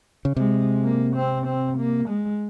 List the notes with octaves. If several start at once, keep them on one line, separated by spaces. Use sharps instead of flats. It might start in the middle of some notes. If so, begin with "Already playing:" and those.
C#3
C3 G#3
A#3
C4
C4
A#3
G#3